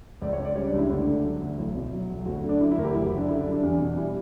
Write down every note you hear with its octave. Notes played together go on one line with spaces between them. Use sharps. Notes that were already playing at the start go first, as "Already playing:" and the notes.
C#2 D5
C#5
C#3
D5
G3 C#5
D4
C#2 E4
D2 D4
D3
F#3
D2
B1 E4
B2
F#3
B1
D2 F#4
D3
D4
F#3 E4
E4
D2 A#4
G4
F#1 E4
F#4
F#2
D4
D3 E4
D4
G3
D4
E2 D4
B2
G3 E4